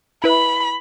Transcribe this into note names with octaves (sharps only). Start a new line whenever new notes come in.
E4 B4 B5